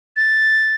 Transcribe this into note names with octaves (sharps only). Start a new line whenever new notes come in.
A6